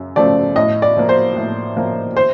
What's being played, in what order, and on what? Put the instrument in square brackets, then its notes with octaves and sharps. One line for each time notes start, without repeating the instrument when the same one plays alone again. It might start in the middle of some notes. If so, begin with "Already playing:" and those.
Already playing: [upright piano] F#2 C#3
C#3 F3 A3 D5
A2 D#5
D5
F3 A#3
C5
A2
F3 A#3
C5